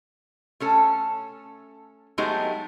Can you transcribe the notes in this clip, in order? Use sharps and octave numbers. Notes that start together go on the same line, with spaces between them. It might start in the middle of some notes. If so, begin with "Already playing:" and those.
A3 C#4 A4
F#3 G#3 A3 B3 D#4 G4